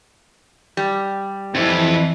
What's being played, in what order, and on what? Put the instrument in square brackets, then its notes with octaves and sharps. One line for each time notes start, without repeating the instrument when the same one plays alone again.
[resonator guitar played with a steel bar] G3
[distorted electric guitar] F2 [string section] E3